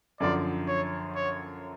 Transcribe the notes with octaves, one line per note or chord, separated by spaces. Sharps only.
F#2 D3 F3 D5
C#5
C#5